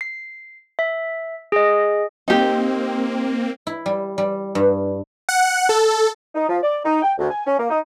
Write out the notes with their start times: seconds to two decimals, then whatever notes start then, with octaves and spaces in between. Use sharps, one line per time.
0.01 C7
0.79 E5
1.52 G#4 D#5
2.28 A#3 C4 D#4 G4
3.67 E4
3.86 G3
4.18 G3
4.55 G2
5.29 F#5
5.69 A4
6.35 D#4
6.48 F3
6.62 D5
6.85 D#4
7.02 G5
7.18 D2
7.30 G#5
7.46 C#4
7.58 A#3
7.70 D#4